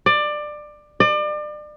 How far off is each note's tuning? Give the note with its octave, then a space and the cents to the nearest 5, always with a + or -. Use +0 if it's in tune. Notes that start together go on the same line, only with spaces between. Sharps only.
D5 +20
D5 +35